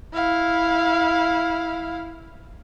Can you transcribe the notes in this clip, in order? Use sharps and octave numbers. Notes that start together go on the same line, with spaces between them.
E4 F5